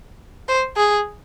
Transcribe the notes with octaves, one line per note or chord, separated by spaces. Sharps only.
C5
G#4